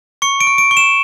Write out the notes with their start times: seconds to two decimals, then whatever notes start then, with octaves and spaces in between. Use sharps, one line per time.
0.22 C#6 C#7
0.40 D7
0.47 C#6
0.58 D7
0.71 C#6
0.77 E7